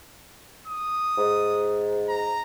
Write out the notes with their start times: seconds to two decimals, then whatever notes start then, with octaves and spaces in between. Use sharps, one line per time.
0.68 D#6
1.18 G#2
2.09 A#5